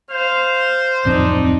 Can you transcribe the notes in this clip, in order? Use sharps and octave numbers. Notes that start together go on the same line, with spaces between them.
C5 F5
D1 F2 C4 D4 D#4